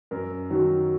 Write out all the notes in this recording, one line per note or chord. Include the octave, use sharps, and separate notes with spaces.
F#2 A#4
D#3 F#3